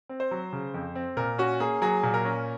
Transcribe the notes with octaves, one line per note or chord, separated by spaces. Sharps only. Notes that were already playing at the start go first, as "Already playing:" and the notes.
C4
C5
F#3
C#3
F2
C4
A#2 A#4
C#4 F#4
A#3 G#4
F#3 G#4
A#2
A#4
C#4